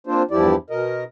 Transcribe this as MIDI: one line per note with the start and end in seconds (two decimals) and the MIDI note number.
0.07 0.22 58
0.07 0.22 60
0.07 0.22 62
0.07 0.22 65
0.07 0.22 72
0.31 0.55 40
0.31 0.55 43
0.31 0.55 53
0.31 0.55 64
0.31 0.55 67
0.31 0.55 74
0.70 1.04 47
0.70 1.04 70
0.70 1.04 75